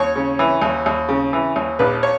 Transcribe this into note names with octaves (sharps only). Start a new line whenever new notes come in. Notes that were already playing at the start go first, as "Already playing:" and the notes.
Already playing: D#2 C#5
C#3
E3
D#2
D#2
C#3
E3
D#2
A#1 B4
C#5